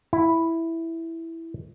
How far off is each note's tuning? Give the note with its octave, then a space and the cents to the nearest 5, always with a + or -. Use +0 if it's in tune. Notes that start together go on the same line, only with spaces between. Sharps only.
E4 +0